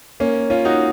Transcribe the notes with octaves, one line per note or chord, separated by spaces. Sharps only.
A#3 C#4
C#4 F4
D#4 F#4